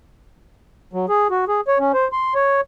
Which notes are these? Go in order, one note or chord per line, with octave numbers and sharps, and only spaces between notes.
F#3
G#4
F#4
G#4
C#5
C#4
C5
C6
C#5